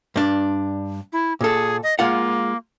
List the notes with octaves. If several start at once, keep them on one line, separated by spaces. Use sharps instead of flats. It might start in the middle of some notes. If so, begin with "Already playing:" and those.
G2 D4
E4
A#2 G#4 A4
D#5
G#3 A#3 F4 F#5